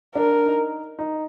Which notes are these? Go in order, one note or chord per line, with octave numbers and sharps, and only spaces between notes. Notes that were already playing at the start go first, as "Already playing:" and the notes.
D4 A#4
D#4
D#4